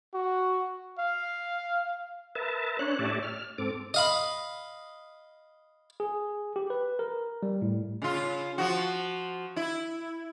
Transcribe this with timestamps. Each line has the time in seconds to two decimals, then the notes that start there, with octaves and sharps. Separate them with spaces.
0.14 F#4
0.99 F5
2.35 A#4 B4 E5 A5
2.79 C#4 D4 C#5 F#6
2.99 A2 G4 C#5 D5 E5 A5
3.23 F6
3.58 G#2 C4 A4 D6
3.94 D#5 F5 B5
6.00 G#4
6.56 G4
6.70 B4
6.99 A#4
7.43 G3
7.62 A2
8.02 C#3 F4
8.58 F3 F#4
9.56 E4